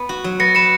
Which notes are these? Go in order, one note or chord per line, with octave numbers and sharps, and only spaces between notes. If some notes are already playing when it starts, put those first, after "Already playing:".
Already playing: B3
F#4
F#3
B3 A#6 C#7
B4 C#7 E7